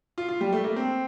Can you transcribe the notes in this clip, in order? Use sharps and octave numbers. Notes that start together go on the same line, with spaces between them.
F4
F4
G3
A3
A#3
C4